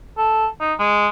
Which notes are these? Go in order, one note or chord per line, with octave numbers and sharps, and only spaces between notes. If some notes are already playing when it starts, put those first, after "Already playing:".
A4
D#4
G#3